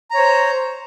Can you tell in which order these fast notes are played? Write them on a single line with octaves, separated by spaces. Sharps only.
A#5 C#5 C5